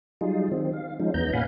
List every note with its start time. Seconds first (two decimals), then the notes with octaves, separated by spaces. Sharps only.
0.21 F#3 G3 D#4 F4 G#4
0.52 D#3 C4
0.73 F5
1.00 F3 G#3 C#4 D#4
1.14 E2 B3 A#5 G6
1.33 A#2 C#4 F5 F#5 G#5 B5